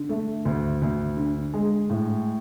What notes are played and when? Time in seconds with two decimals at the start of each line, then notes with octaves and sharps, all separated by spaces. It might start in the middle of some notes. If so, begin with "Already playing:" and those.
Already playing: D3
0.09 A3
0.45 D2
0.82 D2
1.17 D3
1.54 G#3
1.90 A2